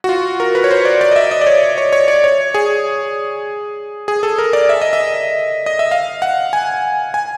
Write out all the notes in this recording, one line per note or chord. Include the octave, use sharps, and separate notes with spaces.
F#4
F4
A#4
B4
C#5
C5
D5
D5
D#5
E5
D#5
D5
C#5
C#5
C#5
D5
C#5
G#4
G#4
A4
A#4
D5
E5
D#5
E5
D#5
E5
F5
F#5
G#5
G#5